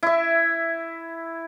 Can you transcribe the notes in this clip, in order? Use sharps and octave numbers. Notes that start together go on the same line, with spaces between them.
E4 E5